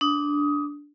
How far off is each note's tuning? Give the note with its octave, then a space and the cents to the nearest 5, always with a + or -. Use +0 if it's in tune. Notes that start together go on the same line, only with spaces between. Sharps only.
D4 -10 D#6 +15